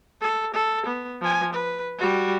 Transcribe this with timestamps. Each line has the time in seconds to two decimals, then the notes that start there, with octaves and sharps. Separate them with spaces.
0.22 A4
0.54 A4
0.86 B3
1.22 F3 G#5
1.53 B4
1.98 G3 F#4